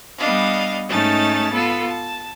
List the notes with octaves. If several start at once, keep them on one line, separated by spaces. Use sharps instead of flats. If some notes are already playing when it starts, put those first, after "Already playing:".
G3 B3 D4 D#5 F5
G#2 A3 C#4 D#4 A5 A6
B3 F4 A4 B4
A5